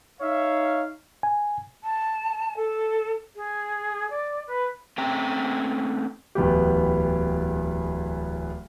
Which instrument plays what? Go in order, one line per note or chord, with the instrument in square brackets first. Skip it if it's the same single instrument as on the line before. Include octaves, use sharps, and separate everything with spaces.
[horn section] D#4 C#5 E5 F5
[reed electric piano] G#5
[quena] A5
A4
G#4
D5
B4
[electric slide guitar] A3 C4 C#4 G5 A#5
[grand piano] D1 E2 B3 G4